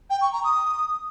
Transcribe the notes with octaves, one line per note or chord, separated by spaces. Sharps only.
G5
C#6
A#5
D#6